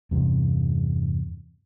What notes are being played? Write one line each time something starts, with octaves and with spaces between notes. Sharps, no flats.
E2 G2 C3